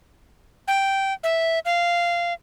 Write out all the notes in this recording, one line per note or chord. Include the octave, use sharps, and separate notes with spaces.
G5
E5
F5